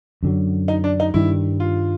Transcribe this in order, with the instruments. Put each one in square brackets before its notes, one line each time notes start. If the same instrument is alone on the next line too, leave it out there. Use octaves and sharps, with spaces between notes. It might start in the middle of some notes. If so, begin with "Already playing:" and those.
[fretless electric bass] F#2 D3 F#3
[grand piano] D#4
D4
D#4
[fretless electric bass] G2 D#3 G3 [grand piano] E4
[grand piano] F4